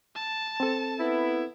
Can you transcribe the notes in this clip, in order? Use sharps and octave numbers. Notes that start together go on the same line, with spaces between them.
A5
C4 A4
B3 E4